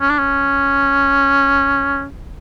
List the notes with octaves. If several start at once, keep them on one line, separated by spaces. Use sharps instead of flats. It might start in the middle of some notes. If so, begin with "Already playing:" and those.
C#4
D4
C#4